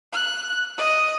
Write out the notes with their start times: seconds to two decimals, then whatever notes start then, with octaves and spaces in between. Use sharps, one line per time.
0.13 F#6
0.78 D#5